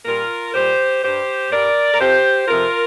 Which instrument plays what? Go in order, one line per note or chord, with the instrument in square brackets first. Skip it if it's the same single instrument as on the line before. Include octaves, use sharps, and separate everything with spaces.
[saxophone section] A#2 G3 F4 A#4
A#2 G3 G4 C5
G2 G3 G4 C5
G2 G3 A#4 D5
A#4
F2 C3 F3 G4 C5
F2 C3 F3 F4 A#4